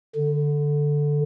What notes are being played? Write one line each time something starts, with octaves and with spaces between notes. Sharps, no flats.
D3